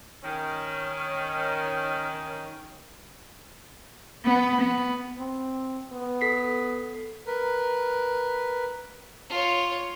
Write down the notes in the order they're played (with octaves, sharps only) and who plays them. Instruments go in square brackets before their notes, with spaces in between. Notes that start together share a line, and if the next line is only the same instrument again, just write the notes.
[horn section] D#3 C#4
[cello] B3
B3
[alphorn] C4
B3
[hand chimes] A4 B6 C7
[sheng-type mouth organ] A#4 B4
[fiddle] F4 C#5